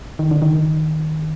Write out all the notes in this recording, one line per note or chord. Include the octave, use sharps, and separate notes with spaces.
D#3
D3
D#3